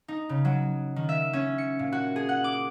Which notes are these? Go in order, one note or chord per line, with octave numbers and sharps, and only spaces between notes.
D#4
C#3
F#3
D#3
E5
C#4
C#7
A#2
F#4
G#4
F#5
D6